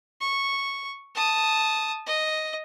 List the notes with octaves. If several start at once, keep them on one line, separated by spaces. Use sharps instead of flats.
C#6
A5 D#6
D#5